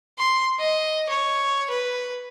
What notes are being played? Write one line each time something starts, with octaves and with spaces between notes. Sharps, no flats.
C6
D#5
C#5
B4